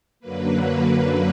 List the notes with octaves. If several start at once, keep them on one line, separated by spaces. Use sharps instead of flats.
F#2 D3 F#3 A#3 B4